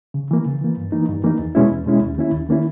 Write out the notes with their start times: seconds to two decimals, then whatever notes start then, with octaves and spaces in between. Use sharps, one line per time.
0.14 C#3
0.31 E3 A#3
0.45 C#3
0.61 E3 A#3
0.77 G2
0.92 E3 A#3 D#4
1.09 G2
1.24 E3 A#3 D#4
1.39 E2
1.55 B2 G#3 C#4 E4
1.71 E2
1.86 B2 G#3 C#4 E4
2.01 D#2
2.18 D#3 A#3 C#4 E4
2.33 D#2
2.49 D#3 A#3 C#4 E4